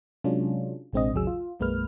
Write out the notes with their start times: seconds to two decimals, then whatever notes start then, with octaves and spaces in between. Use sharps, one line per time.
0.24 C3 F#3 G#3 C#4 D4 F4
0.93 A1 B2 G#3 C4 D4 D#5
1.14 A1 D#2 C#3 F#3 G#4 E6
1.27 F4
1.60 B1 F#2 G#3 A#3 B4 F6